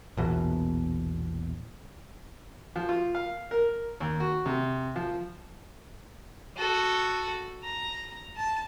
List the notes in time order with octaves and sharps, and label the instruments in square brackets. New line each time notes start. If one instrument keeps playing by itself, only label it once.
[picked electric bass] A#1 E2 B2
[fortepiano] F3
F4
F5
A#4
D#2
F#4
C3
F3
[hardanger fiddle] F#4 A4
A#5
A5